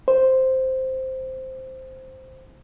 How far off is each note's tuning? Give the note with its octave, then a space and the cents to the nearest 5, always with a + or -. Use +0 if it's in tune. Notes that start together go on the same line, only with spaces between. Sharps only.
C5 +0